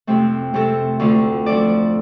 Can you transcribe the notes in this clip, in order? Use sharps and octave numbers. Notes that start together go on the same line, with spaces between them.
F2 C3 A3 C4
C3 A3 C4 A4
D2 D3 A3 F4
F3 D4 A4 D5